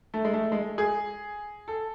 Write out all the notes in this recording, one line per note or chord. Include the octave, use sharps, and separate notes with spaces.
A3
G#3
A3
G#3
G#4
A4